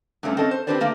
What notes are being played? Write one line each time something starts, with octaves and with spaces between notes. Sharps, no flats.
G2 C3 A3 C#4
C4 C#4 A4 D#5
C5
C4 D4 G4 B4 C5 D5
D3 A3 A#3 G4